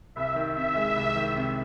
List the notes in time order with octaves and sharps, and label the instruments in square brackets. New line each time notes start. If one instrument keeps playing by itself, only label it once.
[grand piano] C2 [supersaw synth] E5
[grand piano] D#3
[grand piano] C3 [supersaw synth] E5
[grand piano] G#3
C2
D#3
C3